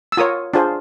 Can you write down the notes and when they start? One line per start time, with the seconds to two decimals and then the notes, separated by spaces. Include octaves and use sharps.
0.12 E6
0.17 F4 A#4 C#5 D#6
0.54 D4 F4 G#4 C5